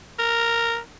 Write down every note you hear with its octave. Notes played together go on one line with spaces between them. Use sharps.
A#4